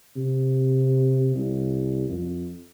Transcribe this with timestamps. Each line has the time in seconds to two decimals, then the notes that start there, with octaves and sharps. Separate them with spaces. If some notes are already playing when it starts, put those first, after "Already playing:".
0.16 C3
1.35 C2
2.09 F2